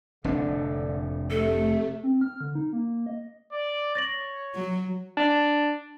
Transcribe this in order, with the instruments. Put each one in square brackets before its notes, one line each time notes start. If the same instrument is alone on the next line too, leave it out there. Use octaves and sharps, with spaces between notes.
[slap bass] F1 A2 D4 [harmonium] D3
[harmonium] C3 [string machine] A3 [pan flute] A4
[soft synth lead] C4
F6
D3
D#4
A#3
D#5
[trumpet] D5
[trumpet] C#5 [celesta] A6 A#6 F#7
[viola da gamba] F#3
[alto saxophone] D4